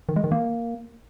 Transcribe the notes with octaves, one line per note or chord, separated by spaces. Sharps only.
D#3
G#3
D#3
A#3